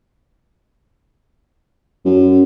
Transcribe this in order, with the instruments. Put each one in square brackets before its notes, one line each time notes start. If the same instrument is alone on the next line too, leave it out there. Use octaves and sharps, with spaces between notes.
[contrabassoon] F#2